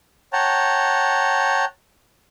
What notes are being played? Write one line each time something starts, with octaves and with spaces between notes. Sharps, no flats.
C#5 F#5 G5 A5 A#5